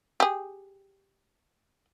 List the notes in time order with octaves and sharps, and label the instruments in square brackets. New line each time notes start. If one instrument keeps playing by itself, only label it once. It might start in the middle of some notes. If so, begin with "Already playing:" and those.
[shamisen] G4 G#4